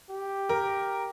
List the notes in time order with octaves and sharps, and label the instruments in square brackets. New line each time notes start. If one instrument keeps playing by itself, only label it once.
[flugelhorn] G4
[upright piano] A#4